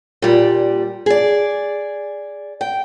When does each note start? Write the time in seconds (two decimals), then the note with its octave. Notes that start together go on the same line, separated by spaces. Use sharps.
0.22 A#2 G3
1.06 G#4 D5
2.61 G5